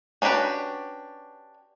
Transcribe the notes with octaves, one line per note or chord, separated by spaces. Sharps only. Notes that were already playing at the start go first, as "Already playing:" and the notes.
C#4 D4 F#4 G4 B4